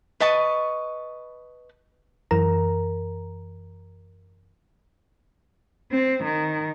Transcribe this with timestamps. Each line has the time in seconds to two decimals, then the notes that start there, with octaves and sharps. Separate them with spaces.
0.20 B4 D#5 A5 C#6
2.31 F#2 E3 A#4 A#5
5.92 C4
6.25 D#3